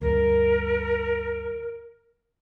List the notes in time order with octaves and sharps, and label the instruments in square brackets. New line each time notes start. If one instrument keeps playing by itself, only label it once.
[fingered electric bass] D2 G2 [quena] A#4